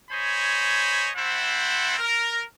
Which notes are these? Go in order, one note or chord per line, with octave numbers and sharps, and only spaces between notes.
C5 C#5 D#5 G#5 B5
A3 C4 E4 C5 F#5
A#4